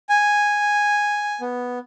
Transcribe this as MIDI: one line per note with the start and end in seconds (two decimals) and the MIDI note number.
0.09 1.41 80
1.41 1.79 59